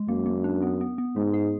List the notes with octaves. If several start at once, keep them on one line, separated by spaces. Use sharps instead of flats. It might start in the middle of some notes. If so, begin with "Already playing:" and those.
Already playing: G#3
F#2 A#3
A#3
D4
B3
B3
B3
G#2 G#3
G#4